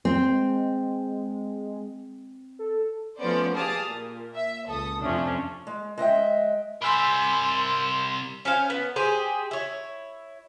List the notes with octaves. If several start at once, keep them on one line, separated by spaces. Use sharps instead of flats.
C4
G#3
A4
F3 A3 B3 C#4 C5 D5
G4 G#4 D5 F5 A5 D#6
A#2
E5
C#2 A4 D#6
F2 C3 F3 A3 C#4 D4
G#3
G#3 D#5 E5 G5
C3 G3 A#4 G#5 B5 C6 E6 B6
C#4 C5 F5
B3
G4 G#4 C5
E4 C#5